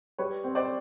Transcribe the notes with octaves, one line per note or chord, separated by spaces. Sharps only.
G3 B4 C#5
C4
C5 D5